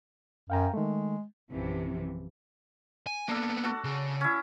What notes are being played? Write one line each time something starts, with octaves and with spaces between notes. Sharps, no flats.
F#2 F5 G5 A#5
D#3 G#3 A3
A#1 F#2 C3 E3 F3
G#5
A#3 B3 D4 A4
F#4 A4 F#5
C#3
C#4 E4